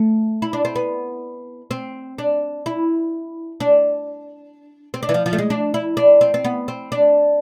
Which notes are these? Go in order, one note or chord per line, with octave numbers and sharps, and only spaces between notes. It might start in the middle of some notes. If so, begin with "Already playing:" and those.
Already playing: A3
E4
D4
C4
B3
C4
D4
E4
D4
C4
D4
E3
F3
F3
A3
G#3
D4
E4
D4
C4
C4
B3
C4
D4